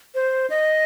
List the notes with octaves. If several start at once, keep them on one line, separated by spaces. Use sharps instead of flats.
C5
D#5